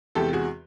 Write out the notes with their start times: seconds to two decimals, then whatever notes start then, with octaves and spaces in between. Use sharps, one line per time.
0.15 E2 C3 E3 G#3 G4 A4
0.33 F#4 G#4